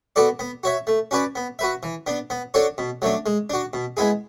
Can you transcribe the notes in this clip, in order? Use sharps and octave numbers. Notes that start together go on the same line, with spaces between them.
B3 F#4 A4 D5
B3
F#4 C#5 E5
A3
C#4 F#4 B4 D5
B3
F#4 B4 E5
E3
B3 D4
B3
D4 F#4 A4 C#5
B2
F#3 A3 D4
G#3
D4 F#4
B2
G#3 B3 E4 G#4